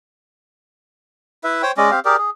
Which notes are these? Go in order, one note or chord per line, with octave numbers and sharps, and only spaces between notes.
E4 B4 E5
C5 C#5 G5
G#3 C#4 D5 D#5
C4 G4 F5
G4 G#4 A#4 D5
G#4